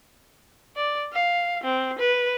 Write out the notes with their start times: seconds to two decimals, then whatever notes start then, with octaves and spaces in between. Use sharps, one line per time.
0.76 D5
1.13 F5
1.64 C4
1.99 B4